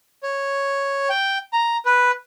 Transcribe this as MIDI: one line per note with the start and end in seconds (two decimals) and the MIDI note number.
0.23 1.09 73
1.10 1.38 79
1.53 1.77 82
1.86 2.11 71